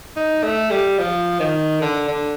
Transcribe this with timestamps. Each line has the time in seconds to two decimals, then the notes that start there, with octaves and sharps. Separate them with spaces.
0.16 D#4
0.43 A3
0.71 G3
0.98 F3
1.40 D#3
1.81 D3
2.08 D3